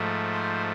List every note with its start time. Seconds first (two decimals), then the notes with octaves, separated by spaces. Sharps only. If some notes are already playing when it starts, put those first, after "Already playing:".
Already playing: G#2 F3 A3
0.31 C5